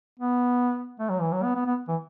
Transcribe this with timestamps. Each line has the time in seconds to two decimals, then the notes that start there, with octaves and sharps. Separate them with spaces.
0.20 B3
1.00 A3
1.10 F#3
1.21 E3
1.32 F#3
1.43 B3
1.55 B3
1.66 B3
1.88 E3